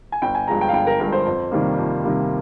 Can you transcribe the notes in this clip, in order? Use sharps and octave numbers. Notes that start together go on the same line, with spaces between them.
G#5
G1 G5
G#5
G2 F3 G#3 A#5
G5
F5
G1 G5
A#4
G2 F3 G#3 A#4
C5
F2
C3 D#3 G3 A#3
F2
C3 D#3 G3 A#3